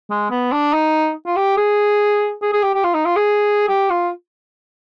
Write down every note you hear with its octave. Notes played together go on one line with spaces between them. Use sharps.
G#3
B3
D4
D#4
F4
G4
G#4
G#4
G#4
G4
G4
F4
D#4
F4
G#4
G4
F4